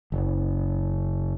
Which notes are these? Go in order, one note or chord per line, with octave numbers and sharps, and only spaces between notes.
F#1